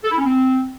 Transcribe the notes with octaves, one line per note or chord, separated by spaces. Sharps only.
A4
E4
C#4
C4